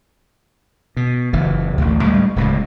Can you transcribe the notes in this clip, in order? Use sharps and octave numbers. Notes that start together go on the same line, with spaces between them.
B2
F#1 E3
A1 D2
A2 G3 G#3
D1 C#2 A#2